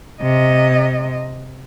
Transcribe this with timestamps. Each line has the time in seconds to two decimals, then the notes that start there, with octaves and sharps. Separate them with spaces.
0.22 C3 D#5